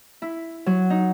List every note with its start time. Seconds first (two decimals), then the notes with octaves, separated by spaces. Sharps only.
0.22 E4
0.66 F#3
0.90 D#4